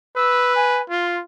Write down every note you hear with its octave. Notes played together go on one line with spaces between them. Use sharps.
B4 E6
G#5
F4 C6